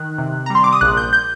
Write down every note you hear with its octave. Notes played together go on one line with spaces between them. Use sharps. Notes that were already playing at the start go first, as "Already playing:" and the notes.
Already playing: D#3 F#6
C3
A#5
G3
C6
D6
D#6
A#1 F#6
G6
G6